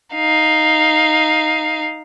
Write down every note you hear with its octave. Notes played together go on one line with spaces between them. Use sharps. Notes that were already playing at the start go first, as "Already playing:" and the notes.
D#4 F5